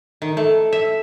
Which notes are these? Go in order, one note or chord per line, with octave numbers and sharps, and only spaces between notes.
D#3
A3
E5